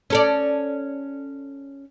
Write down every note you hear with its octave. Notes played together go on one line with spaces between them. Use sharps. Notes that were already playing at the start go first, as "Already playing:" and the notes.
C#4 A4 D5